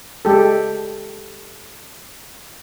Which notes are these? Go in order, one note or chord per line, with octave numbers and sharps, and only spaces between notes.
G#3 G4 A4